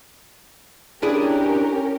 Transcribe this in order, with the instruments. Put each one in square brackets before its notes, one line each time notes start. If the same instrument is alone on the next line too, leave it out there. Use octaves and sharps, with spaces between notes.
[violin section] C#4 G4 A#4 [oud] D4 E4 G#4